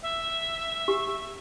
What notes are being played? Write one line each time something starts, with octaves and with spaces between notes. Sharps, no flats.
E5
G4